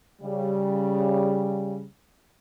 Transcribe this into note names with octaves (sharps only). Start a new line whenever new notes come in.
C#3 G3